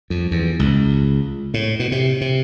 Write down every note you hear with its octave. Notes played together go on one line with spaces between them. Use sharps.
F2
E2
C#2
A2
B2
C3
C3